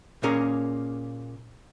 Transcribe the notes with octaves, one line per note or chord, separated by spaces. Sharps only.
A#2 A#3 C#4 G#4 A#4